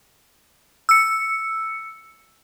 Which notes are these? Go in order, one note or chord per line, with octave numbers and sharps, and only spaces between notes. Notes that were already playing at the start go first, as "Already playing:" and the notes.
E6 C#7